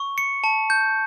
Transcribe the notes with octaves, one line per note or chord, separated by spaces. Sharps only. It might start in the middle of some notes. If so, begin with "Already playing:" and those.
Already playing: C#6
C#7
A5
G6